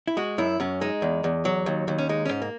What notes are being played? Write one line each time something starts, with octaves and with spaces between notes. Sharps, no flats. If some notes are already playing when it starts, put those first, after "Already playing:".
E4
G#3 F#4
F#2 E4
F#2 C#4
G#3 D#4
E2
E2
F#3
D#2
D#2
C#4
G#3 D#4
C#4
G#2
A#3